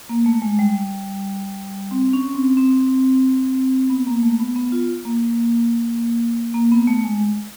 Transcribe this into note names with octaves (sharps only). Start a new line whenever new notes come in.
A#3
A3
G#3
G3
C4
C#4
C4
C4
B3
A#3
A3
B3
B3
F4
A#3
A#3
B3
A3
G#3